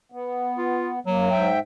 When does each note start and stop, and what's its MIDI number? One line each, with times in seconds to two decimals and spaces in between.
0.12 0.99 59
0.58 0.90 65
1.07 1.29 42
1.07 1.49 54
1.07 1.29 58
1.31 1.59 44
1.31 1.59 76
1.31 1.59 79